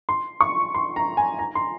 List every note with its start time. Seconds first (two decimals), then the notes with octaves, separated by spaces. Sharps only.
0.09 C6
0.41 C#6
0.74 C6
0.96 A#5
1.17 G#5
1.39 A#5
1.55 C6